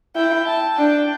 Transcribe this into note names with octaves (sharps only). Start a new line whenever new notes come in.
E4 G5
A5
D4 G5